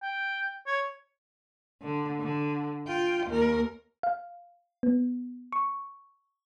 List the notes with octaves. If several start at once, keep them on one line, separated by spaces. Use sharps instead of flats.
G5
C#5
D3
D3
F4 G5
D#2 A#4
F5
B3
C#6